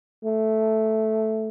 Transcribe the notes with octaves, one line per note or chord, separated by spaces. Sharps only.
A3